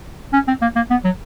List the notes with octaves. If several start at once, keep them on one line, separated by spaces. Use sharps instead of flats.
C#4
C4
A#3
A#3
B3
F#3